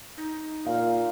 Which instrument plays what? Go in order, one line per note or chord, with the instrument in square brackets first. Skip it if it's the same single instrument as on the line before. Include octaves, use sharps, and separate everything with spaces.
[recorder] D#4
[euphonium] A#2 [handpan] F5